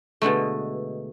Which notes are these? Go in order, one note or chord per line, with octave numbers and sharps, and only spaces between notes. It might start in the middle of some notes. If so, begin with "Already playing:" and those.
B2 D3 G#3 A3